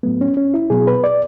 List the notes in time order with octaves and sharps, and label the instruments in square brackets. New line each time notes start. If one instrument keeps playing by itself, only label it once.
[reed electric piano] A2 F#3 A3 B3
C#4
C#4
E4
B2 F#3 B3 G#4
B4
D5